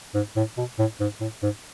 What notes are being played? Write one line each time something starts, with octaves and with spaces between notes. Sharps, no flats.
G#2
A2
B2
A2
G#2
A2
G#2